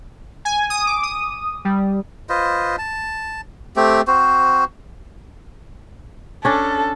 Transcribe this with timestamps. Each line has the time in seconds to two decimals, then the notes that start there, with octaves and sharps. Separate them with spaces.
0.45 G#5
0.70 D#6
0.87 D6
1.03 D#6
1.65 G3
2.29 F4 B4 C5 D#5
2.78 A5
3.76 A3 C4 G4
4.07 C4 F#4 C5
6.45 C#4 D4 A4